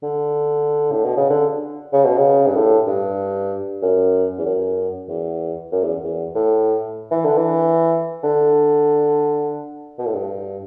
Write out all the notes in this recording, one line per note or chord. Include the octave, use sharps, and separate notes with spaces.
D3
A2
B2
C#3
D3
C#3
B2
C#3
G2
A2
G2
F#2
E2
F#2
E2
F#2
E2
E2
A2
E3
D3
E3
D3
B2
A2
G2